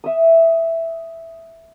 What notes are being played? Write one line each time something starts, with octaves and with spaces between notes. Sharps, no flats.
E5 D#6